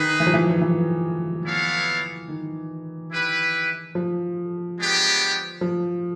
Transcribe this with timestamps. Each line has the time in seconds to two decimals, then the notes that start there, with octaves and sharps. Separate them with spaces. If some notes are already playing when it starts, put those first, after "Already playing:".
Already playing: D#3 D#4 G#4 B4
0.20 E3
0.27 F3
0.34 E3
0.50 F3
0.61 E3
1.45 B3 E4 A4 C#5 F5
2.28 D#3
3.12 E4 G4 B4
3.95 F3
4.79 G#3 B3 D4 G4 B4
5.61 F3